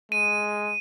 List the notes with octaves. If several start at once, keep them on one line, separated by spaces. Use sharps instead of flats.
G#3 D#7